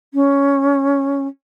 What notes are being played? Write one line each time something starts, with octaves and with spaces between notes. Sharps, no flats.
C#4